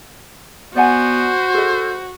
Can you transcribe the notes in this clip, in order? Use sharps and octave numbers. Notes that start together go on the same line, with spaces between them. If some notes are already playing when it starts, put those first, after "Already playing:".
B3 F#4 C5 D5 F#5 G#5
G#4 A4 D#5